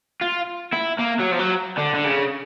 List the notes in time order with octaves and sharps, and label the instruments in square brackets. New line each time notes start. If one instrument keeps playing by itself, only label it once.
[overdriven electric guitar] F4
E4
A#3
F#3
F3
F#3
D3
D3
C#3